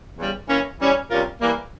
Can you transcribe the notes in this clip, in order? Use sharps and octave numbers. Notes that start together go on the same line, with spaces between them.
E2 C#3 G3
E3 A#3 C#4
E3 G3 C#4
C3 G3 C#4 F4 A#4
E3 G3 A#3